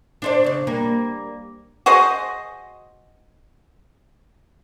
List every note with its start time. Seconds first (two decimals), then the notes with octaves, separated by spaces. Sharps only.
0.22 D4 C5 D5
0.44 C#3 D5
0.67 G3 A#3
1.86 F#4 G#4 C5 D#5